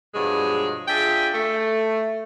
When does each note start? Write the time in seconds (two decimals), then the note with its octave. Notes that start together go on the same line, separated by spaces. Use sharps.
0.15 G2 B2 F3 F#3 G#3
0.88 D4 F4 G#4 E5 G5
1.34 A3